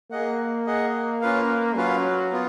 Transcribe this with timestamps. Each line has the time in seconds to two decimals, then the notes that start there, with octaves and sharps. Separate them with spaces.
0.11 A#3 G#4 D#5 F#5
0.67 G#4 D#5 F#5
1.21 C#4 F4 B4 F5
1.76 F#3 C#4 F4 B4 F5
2.32 B3 F4